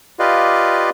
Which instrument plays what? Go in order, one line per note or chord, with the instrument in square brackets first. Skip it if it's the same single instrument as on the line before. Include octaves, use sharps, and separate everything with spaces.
[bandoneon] F4 G4 B4 D5 D#5 F5